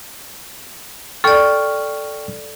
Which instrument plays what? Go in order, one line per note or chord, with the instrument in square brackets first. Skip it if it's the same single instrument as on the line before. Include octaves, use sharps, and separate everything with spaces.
[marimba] A4 D5 [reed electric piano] G5 C#6 F6